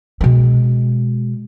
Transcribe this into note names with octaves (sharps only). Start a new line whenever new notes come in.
B2 G#3